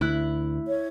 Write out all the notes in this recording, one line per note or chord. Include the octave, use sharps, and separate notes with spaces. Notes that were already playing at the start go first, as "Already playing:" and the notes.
D2 E4 F#6
C#5